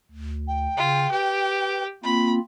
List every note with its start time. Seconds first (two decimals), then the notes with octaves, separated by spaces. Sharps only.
0.11 D2
0.48 G5
0.77 C#3 F4
1.11 G4 B4
2.04 A#3 C4 F4 B5